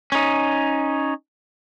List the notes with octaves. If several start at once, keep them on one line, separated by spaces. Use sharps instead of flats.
C#4 D#4